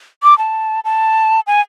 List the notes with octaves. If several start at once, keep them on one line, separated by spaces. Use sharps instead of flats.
D6
A5
A5
G#5